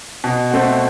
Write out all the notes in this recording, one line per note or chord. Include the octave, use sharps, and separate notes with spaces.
B2
A3 C4 F#4